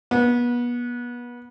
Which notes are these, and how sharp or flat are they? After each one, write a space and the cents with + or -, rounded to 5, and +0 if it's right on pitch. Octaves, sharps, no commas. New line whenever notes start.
B3 -30